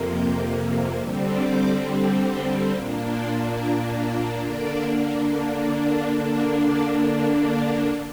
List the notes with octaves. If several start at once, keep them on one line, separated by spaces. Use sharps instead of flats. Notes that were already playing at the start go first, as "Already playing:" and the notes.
Already playing: F2 C3 A#3
G6
D3 G3 C4
D6
C6
A#2 A#3 D4
C6
A#5
F5
D3 A#3 D4 D5
D3 A#3 D4
D5
F5